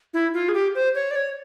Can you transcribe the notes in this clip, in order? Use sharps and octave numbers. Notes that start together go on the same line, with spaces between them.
E4
F4
G#4
G4
C5
C#5
D5
C#5